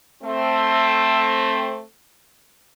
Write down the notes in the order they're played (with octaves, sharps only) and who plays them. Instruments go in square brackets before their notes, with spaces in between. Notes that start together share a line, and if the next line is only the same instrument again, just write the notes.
[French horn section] A3 C4